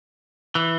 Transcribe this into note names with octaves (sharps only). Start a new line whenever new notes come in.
E3